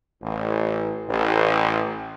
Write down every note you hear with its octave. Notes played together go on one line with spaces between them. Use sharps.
A1
A1